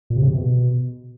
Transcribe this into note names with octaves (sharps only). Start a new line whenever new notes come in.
A#2
C3
C#3
C3
B2